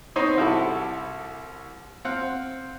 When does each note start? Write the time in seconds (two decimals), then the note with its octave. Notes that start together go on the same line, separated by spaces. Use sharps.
0.16 B3 C4 D#4 C5 C#5 D#5
0.37 C2 E4 F#4 G4 A4
2.05 C4 F5 F#5